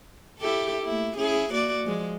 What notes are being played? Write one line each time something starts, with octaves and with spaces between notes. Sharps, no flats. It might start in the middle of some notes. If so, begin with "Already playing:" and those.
E4 G4 A4
A3 A#3 E4
C#4 E4 G#4
A#3 F#4 D5
F3 G#3